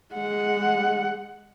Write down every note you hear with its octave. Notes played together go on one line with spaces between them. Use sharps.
G#3 F#5